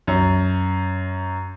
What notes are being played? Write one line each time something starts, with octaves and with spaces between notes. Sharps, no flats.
F#2